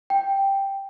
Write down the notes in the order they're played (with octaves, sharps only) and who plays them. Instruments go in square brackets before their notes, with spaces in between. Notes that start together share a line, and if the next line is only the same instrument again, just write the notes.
[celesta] G5